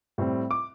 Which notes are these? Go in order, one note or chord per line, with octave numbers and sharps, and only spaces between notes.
A2 G3 C4
D6